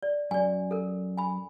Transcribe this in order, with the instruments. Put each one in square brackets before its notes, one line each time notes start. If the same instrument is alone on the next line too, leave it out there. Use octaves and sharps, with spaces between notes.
[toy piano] D5
[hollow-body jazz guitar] F#2 [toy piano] D5 G#5
[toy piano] A4 A#4
G#5 B5